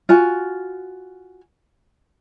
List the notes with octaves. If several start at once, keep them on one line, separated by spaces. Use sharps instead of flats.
F4 F#4 G#5